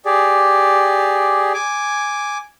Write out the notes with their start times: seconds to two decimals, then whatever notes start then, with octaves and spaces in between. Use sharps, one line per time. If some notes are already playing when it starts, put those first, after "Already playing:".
0.05 G4 G#4 D5
1.54 G#5 D6